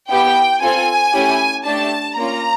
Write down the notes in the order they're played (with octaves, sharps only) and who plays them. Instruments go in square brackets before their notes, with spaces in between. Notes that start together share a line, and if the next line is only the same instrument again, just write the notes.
[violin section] B3 E4 G4 G5
C4 F4 A4 G#5
A3 C#4 E4 G4
A3 D4 G4 A5
A#3 C#4 F4 A#5